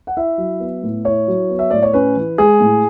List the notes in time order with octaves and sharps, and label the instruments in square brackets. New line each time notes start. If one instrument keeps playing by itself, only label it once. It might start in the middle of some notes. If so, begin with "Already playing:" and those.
[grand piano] F#5
E4 E5
F#3
B3
A2
E4 C#5
F#3
B3
E5
A2 D5
C#5
C#4 B4
E3
G#3 G#4
A2